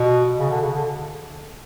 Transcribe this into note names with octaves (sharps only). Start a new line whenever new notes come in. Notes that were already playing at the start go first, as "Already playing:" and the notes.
Already playing: B2
C#3
D3
C#3
D3